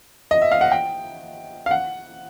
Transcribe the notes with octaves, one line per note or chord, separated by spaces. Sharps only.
D#5
E5
F5
F#5
G5
F5
F#5